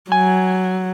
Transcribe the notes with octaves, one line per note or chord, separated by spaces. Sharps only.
F#3 G#5